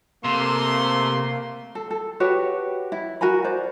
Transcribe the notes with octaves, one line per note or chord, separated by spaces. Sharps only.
C3 A3 A#3 C6
A4
A4
F#4 G4 B4 C#5
E4
F#4 A#4 G#5 B5
C5 D5